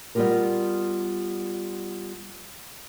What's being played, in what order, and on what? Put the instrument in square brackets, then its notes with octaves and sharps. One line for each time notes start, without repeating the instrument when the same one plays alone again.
[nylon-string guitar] G3 B3 C#4 F4 G4 A#4